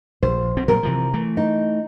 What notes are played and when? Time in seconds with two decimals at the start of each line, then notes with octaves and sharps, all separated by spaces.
0.23 A#1 C5
0.57 B1 B2 C4
0.68 A#2 F#3 G3 A#4
0.83 C3 E3 F3
1.13 E3 A3
1.37 D#4